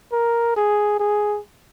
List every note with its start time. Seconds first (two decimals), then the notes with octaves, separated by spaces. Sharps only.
0.12 A#4
0.56 G#4
1.00 G#4